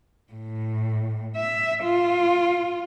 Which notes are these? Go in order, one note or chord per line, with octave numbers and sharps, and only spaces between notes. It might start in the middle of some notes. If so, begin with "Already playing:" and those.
A2
E5
F4